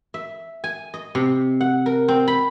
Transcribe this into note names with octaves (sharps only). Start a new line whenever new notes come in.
E5
G#5
D#5
C3
F#5
A#4
C4
B5